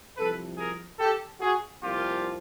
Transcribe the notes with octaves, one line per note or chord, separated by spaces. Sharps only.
C2 C3 F3 A4 B4
G#4 A#4
G4 A4
F#4 G#4
C2 A#2 F3 F4 G4